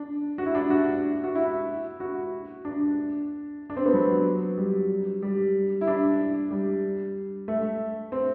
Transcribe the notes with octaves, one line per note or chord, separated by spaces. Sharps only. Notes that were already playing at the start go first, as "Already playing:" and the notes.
Already playing: D4
F#4
E4
D4
E4
F#4
F#4
E4
F#4
D4
D4
C4
B3
F#3
G3
G3
E4
D4
G3
A3
C4